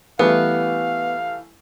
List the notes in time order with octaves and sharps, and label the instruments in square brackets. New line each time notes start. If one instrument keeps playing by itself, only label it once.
[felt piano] E3 G3 A3 [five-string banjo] B3 [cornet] F5